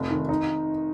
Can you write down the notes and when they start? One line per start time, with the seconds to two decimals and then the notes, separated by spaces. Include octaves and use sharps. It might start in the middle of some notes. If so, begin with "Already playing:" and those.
Already playing: F1
0.10 D#3
0.29 D#4